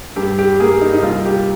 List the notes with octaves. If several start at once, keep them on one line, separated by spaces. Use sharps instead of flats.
G2 G4
G4
A#3 G#4
D#4
D#4
C2 F4
G4